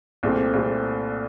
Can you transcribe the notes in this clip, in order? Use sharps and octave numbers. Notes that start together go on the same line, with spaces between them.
C2 A#2 A3 C4
C2 A#2 A3 C4